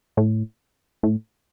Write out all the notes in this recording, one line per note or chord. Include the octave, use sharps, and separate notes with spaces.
A2
A2